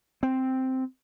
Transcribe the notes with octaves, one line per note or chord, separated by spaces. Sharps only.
C4